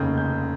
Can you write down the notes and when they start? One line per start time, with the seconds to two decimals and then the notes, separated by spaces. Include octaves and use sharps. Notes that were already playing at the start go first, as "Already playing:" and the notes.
Already playing: F1 D#2 C#3 G6
0.18 G6